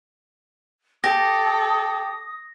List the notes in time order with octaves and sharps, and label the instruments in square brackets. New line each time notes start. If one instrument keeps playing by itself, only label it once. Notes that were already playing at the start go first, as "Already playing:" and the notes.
[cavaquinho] G4 [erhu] A4 [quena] D#6 [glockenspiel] A#6